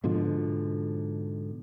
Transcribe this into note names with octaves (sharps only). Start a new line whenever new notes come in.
G#2 B2 D3 F3